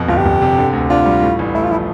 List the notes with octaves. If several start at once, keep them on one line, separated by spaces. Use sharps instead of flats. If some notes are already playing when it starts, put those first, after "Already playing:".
Already playing: F2 B2
G1 F4
G4
G1
C3
D3
D2
D4 F4
G3
A2
A1
A3 E4
F4
F3 E4